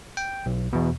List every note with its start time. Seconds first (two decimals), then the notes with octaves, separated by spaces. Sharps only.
0.17 G5
0.46 B1
0.73 E2 B2